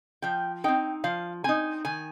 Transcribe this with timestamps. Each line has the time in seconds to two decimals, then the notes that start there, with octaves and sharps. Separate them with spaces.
0.22 F3 G5
0.64 C4 D#4 G5
1.04 F3 F5
1.44 C4 D#4 G#5
1.85 D#3 G#5